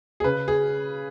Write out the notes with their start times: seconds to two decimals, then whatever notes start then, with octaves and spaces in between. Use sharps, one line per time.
0.20 G#4
0.24 C#3 B4
0.48 G#4